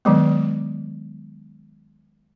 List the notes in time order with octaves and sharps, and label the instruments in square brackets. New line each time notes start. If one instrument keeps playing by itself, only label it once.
[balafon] D#3 F#3 G#3 B3